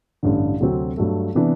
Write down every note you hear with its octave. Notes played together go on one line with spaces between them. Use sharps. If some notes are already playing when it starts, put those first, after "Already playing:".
A1 G2 D3
D2 C3 F#3 C4
G2 F#3 A3
C3 E3 B3 D4